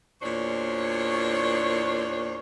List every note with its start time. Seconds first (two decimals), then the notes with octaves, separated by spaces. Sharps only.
0.22 E2 A#2 D4 F#4 C5 C#5